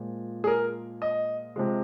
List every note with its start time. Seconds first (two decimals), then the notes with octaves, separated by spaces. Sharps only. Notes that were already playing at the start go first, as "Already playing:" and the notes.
Already playing: A#2 F3 G#3
0.44 G#4
0.47 A#4
1.02 D#5
1.56 C3 F3 G#3